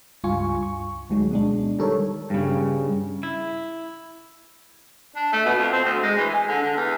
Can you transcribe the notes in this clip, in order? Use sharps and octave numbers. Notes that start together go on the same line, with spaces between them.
C#2 G2 F4 G#5 C#6
C#6
D2 D#3 F#3 G#3
B2 G#3 D4
D#3 G3 A4 A#4 C#5
G2 C#3
E4
D4
A3
B2
F2
C4
D2
G#3
E3
G#4
D3
D3
E2